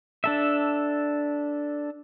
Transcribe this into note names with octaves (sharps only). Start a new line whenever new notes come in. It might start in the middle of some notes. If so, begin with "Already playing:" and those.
D4 A4 E5